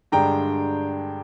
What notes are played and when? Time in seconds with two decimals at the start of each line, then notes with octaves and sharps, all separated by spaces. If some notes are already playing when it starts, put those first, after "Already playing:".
0.12 G2 D3 G#3 G5 A#5